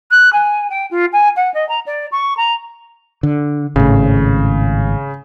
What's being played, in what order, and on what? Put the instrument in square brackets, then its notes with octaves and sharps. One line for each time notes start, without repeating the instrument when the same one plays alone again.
[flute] F#6
G#5
G5
F4
G#5
F#5
D#5
A#5
D5
C#6
A#5
[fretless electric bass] D3
[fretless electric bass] G#1 A2 [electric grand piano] C#3